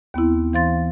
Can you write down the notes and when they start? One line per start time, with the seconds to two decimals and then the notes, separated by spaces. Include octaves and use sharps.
0.14 D#2 B3 C4 E4
0.53 E3 C5 F5 C6 A6